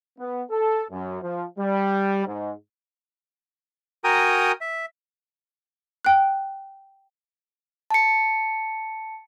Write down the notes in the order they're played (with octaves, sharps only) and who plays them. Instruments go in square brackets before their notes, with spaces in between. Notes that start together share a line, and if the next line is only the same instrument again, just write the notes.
[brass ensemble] B3
A4
F#2
F3
G3
G#2
[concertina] F#4 A#4 G5 G#5 A#5 D#6
E5
[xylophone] G5 F#6
[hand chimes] A5 C#7